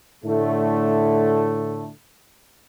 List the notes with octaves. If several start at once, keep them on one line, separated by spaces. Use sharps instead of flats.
A2 D3 A3